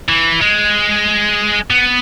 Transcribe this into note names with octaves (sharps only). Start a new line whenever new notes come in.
E3
G#3
B3